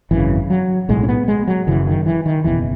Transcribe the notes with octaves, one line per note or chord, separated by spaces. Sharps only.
G#1 F#2 C#3 E3
F#3
B1 A2 G#3
C#4
B3
G#3
F#3
F#1 F#2 C#3 E3
D#3
E3
D#3
F#1 E2 B2 E3